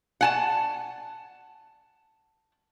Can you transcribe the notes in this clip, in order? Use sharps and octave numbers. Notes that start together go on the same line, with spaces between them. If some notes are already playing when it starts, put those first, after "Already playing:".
F#5 G#5 A5